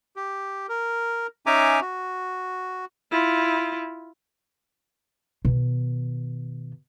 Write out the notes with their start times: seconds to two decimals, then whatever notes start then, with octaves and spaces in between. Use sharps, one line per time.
0.16 G4
0.69 A#4
1.46 C#4 D#4 E5 G#5 A#5 D6
1.81 F#4
3.11 E4 F4
5.45 B2 D#3